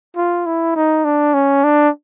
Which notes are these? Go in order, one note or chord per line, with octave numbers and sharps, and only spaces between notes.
F4
E4
D#4
D4
C#4
D4